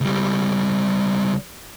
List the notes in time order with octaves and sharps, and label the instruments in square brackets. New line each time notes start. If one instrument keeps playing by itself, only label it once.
[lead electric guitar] C#2 G3